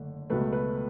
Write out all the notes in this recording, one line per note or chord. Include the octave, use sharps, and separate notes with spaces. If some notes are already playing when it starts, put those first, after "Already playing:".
Already playing: F#1 D3 A3
C#2 B2 F#3 A3 B4
B4